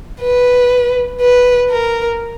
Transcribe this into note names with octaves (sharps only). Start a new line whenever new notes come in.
B4
B4
A#4